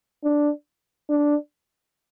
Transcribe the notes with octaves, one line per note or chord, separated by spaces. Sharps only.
D4
D4